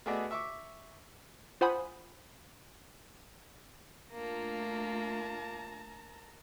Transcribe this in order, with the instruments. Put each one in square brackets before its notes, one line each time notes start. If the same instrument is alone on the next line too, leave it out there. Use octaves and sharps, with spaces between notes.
[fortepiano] A3 B3 F#4 G#4 D5 D#5
E5 C#6 D6
[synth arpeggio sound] F4 C5 F#5 G#5 B5 D#6
[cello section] A3 D4 F4 [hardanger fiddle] A#3 [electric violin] A5 A#5